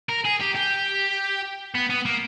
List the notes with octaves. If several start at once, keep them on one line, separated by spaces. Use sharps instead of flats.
A#4
G#4
G4
G4
B3
B3
A#3